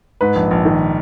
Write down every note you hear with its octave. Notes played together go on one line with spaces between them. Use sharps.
G#2 B4
A#1
A#1
D#3